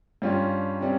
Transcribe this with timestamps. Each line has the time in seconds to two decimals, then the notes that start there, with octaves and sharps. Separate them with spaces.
0.22 G2 G3 C#4 F4
0.81 C3 G3 C#4